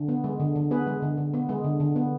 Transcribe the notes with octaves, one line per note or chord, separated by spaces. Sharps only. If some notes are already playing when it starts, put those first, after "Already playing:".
Already playing: D3
B3
G#3
D3
D3
B3 G#4 B4
G#3
D3
D3
B3
G#3
D3
D3
B3